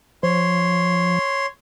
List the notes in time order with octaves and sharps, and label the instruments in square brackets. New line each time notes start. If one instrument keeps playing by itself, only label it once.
[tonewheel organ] F3 [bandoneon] C#5 C6